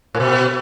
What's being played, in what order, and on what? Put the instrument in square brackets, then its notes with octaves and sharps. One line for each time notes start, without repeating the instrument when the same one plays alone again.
[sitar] A2
B2